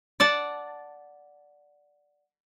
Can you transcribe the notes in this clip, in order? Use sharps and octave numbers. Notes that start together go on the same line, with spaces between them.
D5 F#5 A5